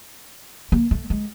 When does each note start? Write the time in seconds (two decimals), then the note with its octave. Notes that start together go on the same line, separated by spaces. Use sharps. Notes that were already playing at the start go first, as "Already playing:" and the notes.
0.72 A#3
0.91 A3
1.10 G#3